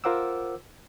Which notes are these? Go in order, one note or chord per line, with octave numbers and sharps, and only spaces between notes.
F4 A#4 C5 F#5 D6 E6